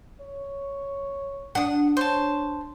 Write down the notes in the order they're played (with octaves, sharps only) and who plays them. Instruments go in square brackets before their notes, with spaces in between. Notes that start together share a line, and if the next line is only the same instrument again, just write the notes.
[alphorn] C#5
[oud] D4 [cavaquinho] F#5 D#6
[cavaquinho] C5 A5 [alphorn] C#5